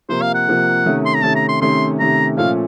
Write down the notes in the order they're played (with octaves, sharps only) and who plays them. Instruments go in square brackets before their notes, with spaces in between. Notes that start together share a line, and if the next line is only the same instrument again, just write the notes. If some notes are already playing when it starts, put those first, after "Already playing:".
[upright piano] C3 F3 A#3 [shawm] C5
[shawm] F5
F#5
[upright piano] C3 F3 A#3
C3 D#3 A3 C#4
[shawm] C6
A#5
[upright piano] C3 D#3 A3 C#4 [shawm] A5
[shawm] A#5
C6
[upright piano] C3 D#3 A3 C#4 [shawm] C6
[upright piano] C3 D#3 A3 C#4 [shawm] A#5
[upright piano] A#2 F3 A3 C#4 [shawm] F5